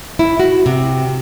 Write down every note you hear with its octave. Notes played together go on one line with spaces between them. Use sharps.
E4
F#4
C3